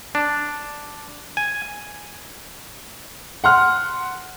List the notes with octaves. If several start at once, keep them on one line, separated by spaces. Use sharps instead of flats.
D4
G#5
F#5 C6 F6